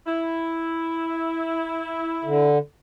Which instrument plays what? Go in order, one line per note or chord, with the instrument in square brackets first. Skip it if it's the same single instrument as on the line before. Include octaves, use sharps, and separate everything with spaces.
[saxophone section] E4
[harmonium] D3